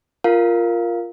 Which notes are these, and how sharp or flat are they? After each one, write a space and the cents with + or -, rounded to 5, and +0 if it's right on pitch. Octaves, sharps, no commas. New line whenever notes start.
F4 -5 A#4 +0 F5 +0